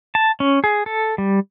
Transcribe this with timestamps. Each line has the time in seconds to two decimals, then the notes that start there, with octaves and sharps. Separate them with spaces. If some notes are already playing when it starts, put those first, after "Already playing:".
0.15 A5
0.40 C#4
0.64 G#4
0.86 A4
1.18 G3